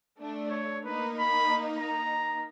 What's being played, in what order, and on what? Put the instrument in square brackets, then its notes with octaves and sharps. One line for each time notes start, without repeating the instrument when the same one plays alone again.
[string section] A3 D4
[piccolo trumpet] C#5
[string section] A#3 D#4 [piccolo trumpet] B4
[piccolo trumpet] B5
A#5